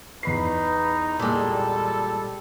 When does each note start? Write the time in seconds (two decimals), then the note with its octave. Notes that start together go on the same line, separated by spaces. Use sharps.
0.23 E2 D#4 B4 B5 C7
1.20 A#2 G3 G#3 A4